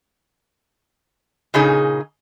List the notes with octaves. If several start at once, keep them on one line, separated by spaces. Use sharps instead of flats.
A#2 C#3 D#4 G#4